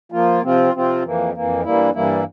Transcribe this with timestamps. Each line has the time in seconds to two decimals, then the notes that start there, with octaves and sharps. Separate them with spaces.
0.12 F3 A#3 F4
0.42 C3 F3 C4 F4
0.73 C3 F3 C4 F4
1.03 F2 E3 A#3
1.34 F2 E3 A#3
1.63 G2 E3 G3 A#3 E4
1.94 G2 E3 G3 A#3 E4